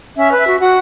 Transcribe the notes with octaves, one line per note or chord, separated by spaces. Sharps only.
C#4 E5
B4
E5
F#4
F#4 F#5